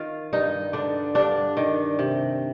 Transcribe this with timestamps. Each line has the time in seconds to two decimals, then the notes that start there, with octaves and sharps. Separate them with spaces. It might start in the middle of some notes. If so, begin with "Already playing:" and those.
Already playing: D#3 F4
0.33 G2 D#4
0.73 D3 D4
1.15 G2 D4
1.57 D#3
1.99 C3